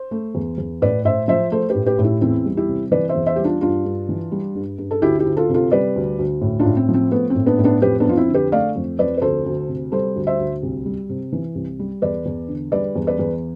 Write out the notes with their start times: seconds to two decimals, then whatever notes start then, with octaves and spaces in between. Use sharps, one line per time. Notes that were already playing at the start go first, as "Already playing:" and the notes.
Already playing: C5
0.11 A3
0.35 E2
0.58 E2
0.82 A2 B4 D5
1.05 A2 C5 E5
1.28 F3 C5 E5
1.51 A3 A4 C5
1.69 G4 B4
1.75 A2
1.86 G4 B4
1.99 A2
2.04 E4 G4
2.21 E2 C4 E4
2.45 G3
2.57 E4 G4
2.68 C3
2.92 E3 B4 D5
3.09 C5 E5
3.15 E2
3.26 C5 E5
3.36 G3 G4
3.44 D4 F4
3.61 G2 D4 F4
3.85 G2
4.09 E3
4.32 G3
4.55 G2
4.78 G2
4.91 A4
5.02 D2 E4 G4
5.19 E4 G4
5.26 D2
5.37 F4 A4
5.49 C3
5.54 F4 A4
5.72 G3 B4 D5
5.96 D2
6.19 D2
6.41 A2
6.59 D4 F4
6.65 A2
6.77 C4
6.89 F3
6.94 C4
7.12 A3 B3
7.30 C4
7.35 A2
7.46 B3 D4
7.58 A2
7.64 B3 D4
7.82 F2 G4 B4
8.00 B3 D4
8.05 F2 F4
8.17 C4 E4
8.28 D3
8.34 G4 B4
8.52 A3 D5 F5
8.76 F2
8.99 F2 B4 D5
9.17 B4
9.22 D2 A4 C5
9.46 D2
9.68 C3
9.92 G3 A4 C5
10.16 D2
10.27 C5 E5
10.39 D2
10.63 C2
10.86 G3
11.09 C3
11.32 E3
11.55 C2
11.79 G3
12.02 E2 B4 D5
12.26 E2
12.48 D3
12.72 G3 B4 D5
12.96 E2
13.07 B4 D5
13.19 E2